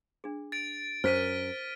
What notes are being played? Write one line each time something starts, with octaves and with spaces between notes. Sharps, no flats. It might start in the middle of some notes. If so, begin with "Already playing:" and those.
D4 G#4
A6 D7
F#2 A#4 C5 F6 B6 D#7